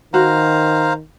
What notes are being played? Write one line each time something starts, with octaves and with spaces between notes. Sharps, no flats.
D#3 F#4 C5 F5 A#5